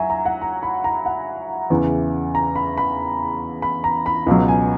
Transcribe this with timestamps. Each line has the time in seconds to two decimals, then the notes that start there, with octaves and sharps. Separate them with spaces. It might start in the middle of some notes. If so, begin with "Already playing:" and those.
Already playing: F#3 E5 G#5
0.10 A#5
0.26 F#5
0.42 A#5
0.63 B5
0.84 A#5
1.06 F#5
1.70 E2 C#3 E3
2.35 A#5
2.56 B5
2.78 B5
3.62 B5
3.84 A#5
4.06 B5
4.27 C#2 B2 F#3
4.48 G#5